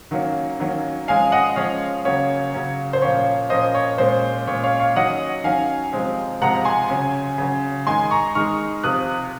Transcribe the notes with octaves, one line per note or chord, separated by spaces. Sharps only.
D#3 F#3 A#3 C#4
D#3 F#3 A#3 C#4
F3 G#3 C#4 F5 G#5
D#5 F#5
F3 G#3 C#4 C#5 F5
C#3 F#3 A#3 C#4 C#5
C#3 F#3 A#3 C#4
C5
A#2 F3 A#3 C#4 C#5
A#2 F3 A#3 C#4 C5 D#5
C#5
A#2 G#3 C#4 C5
A#2 G#3 C#4 C#5
C#5 F5
C#5 F5
D#3 F#3 C#4 D#5 F#5
D#3 F#3 C#4 F5 G#5
C3 F3 G#3 C4
C3 F3 G#3 C4 F#5 A#5
G#5 C6
C#3 F#3 C#4
C#3 F#3 C#4
D#3 G#3 D#4 G#5 C6
A#5 C#6
D#3 G#3 D#4 C#6 F6
C3 F3 C4 D#6 F#6